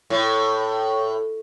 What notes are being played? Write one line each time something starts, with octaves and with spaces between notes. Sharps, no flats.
A2